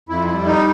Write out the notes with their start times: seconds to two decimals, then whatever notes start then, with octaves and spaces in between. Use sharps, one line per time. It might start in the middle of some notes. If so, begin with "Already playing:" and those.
0.09 F2 E4
0.27 E4
0.34 G3
0.46 D#4